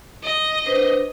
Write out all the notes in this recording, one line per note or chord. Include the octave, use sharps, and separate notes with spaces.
D#5
D4 B4 C5